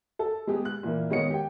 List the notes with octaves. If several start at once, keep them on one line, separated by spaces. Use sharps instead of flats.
A4
G#3 B3 G4 G#4
F#6
A#2 E3 A#4
D#3 G#3 B3 C#5 D#5 C#7
G4 G5